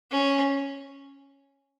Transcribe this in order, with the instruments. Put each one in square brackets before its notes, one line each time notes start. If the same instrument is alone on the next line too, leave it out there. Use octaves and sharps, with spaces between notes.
[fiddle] C#4